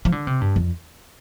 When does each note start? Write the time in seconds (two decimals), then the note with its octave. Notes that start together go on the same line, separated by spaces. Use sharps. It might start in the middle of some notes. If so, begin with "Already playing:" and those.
0.05 F3
0.12 D3
0.27 C3
0.41 G2
0.56 F2